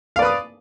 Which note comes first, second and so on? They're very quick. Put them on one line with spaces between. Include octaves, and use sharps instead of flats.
F5 D5 B4 D#6